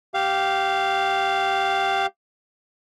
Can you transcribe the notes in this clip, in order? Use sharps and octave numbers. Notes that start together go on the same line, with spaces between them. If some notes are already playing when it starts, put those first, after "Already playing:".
G4 F5